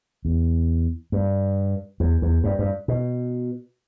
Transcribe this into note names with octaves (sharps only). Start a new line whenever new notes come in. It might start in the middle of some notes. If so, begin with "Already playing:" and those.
E2
G2
E2
E2
G2
G2
B2